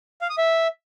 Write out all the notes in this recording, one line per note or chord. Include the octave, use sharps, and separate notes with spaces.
F5
D#6
E5